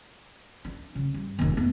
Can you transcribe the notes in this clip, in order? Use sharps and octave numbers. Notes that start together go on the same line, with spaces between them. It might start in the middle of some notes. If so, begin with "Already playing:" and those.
D4
C#3
G2
F1 D#2
A3 B3